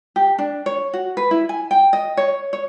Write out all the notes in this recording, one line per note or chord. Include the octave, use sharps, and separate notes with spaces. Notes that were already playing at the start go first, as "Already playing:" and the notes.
G4
D4
C#5
F#4
B4
E4
G#5
G5
D#5
C#5
C#5